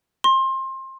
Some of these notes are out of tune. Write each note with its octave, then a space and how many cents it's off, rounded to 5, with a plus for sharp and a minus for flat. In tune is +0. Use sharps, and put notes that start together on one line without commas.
C6 +25